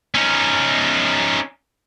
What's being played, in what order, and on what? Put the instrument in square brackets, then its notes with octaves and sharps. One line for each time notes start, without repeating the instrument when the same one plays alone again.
[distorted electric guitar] C#4 D#4